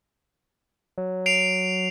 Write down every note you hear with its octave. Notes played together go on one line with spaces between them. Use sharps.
F#3
C7 D7 F7